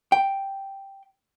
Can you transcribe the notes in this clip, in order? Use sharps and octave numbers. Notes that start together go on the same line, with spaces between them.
G5